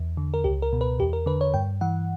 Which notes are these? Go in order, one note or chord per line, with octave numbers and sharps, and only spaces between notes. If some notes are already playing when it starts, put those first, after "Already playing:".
Already playing: E2
D3
A#4
C#2 G4
A#4
B2
B4
E2 G4
A#4
D3 B4
C#5
G2 G5
E3 F#5